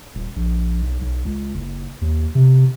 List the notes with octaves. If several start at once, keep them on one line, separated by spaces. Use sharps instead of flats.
D#1
A#1
B1
B1
C#2
F#1
D#2
C3